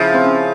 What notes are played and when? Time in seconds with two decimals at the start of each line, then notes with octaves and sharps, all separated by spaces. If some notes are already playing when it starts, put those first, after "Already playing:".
Already playing: C#3 F3 E4
0.14 C4
0.24 C#4